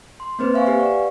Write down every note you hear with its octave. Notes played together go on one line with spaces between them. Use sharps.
C6
A#3 C4 B4 C5
E5 F5 G#5 C#6
G4 B4 F5 G#5
D5 F#5 C#6